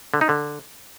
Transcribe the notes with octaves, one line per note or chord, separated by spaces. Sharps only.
D3
D#4
D3